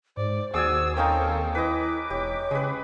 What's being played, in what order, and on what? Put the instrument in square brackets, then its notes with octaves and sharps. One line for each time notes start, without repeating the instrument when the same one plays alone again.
[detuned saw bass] G#2 [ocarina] C5 [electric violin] D5
[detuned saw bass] D#2 [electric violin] F#4 E6 [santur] G#4 D5 G#5
[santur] C4 C#4 D#4 [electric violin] A4 A#4 [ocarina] F5
[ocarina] E4 [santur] B4 D#5 [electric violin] D6
[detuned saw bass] E1 [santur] G4 [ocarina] C#5
[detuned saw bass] C#3 [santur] G#3 B4